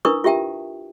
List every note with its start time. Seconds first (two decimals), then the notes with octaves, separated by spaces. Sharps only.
0.05 D4 E4 A#4 B4 C#6 D#6
0.24 F4 G4 E5 G5 A5